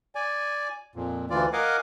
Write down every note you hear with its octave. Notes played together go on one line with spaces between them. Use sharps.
D5 G#5
F2 A#2
D2 E3 F4 D5
A#4 D#5 F5 F#5 G#5 D6